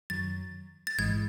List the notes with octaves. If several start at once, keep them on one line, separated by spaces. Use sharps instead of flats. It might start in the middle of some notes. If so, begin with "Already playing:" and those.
F#2 D#3 F#3 A6
A6
A1 G#2 E3 G#3 G#6